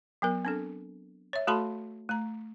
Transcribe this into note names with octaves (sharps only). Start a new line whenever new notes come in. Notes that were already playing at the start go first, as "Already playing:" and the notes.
F#3 B3 A#4
C4 D4 A4
C#5 E5
A3 F#4 A4 A5 B5 C6
A3 A#5